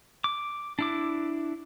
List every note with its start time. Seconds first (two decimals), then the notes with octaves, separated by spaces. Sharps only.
0.24 D6
0.79 D4 E4 D6